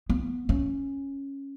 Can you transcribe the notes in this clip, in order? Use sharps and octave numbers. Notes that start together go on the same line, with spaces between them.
B3
C#4